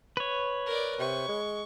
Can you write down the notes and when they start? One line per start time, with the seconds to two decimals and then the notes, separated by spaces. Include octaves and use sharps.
0.17 B4 C#5
0.66 A#4 D5
1.00 C3 C#6
1.29 G#3